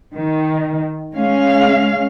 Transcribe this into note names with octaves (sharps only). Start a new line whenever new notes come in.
D#3
G#3 C#4 F5